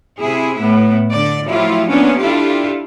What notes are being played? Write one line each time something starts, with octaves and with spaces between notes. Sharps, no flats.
C3 E4 G#4
A2 B3 E4
D3 D5
F3 F#3 A3 E4 F4 G4
A#3 B3 C#4 D4 F4
D4 E4 F4 G4 A4